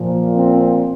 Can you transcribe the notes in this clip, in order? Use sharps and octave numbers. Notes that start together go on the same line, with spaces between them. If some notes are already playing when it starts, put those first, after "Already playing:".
Already playing: A#2 F3
C4